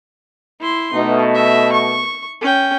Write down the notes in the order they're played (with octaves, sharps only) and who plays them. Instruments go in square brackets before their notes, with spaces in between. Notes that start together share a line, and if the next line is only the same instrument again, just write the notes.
[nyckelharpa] E4 C6
[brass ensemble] B2 A3 [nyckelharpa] D#4
[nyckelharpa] E5
C#6
C#4 G5